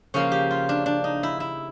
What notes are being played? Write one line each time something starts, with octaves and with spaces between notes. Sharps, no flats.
C#3 F3 A#3 C#4
G4
F4
D4
D4
D#4
E4
E4